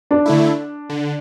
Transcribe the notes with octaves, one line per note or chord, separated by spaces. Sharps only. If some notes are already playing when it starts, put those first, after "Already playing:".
D4
D3 A3 E4
D3